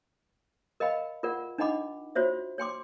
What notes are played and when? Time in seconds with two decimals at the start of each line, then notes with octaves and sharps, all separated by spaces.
0.80 A#4 D#5 F5 G5 B5
1.23 F4 A#4 D5 F#5
1.58 D4 D#4 D#5 F#5 B5 D6
2.15 F4 F#4 C5 C#5 E5
2.58 C#5 G5 C6 D6